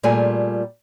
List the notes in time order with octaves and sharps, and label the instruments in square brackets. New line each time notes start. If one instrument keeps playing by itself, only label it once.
[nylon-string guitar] A#2 G3 A3 F4 G#4 G#5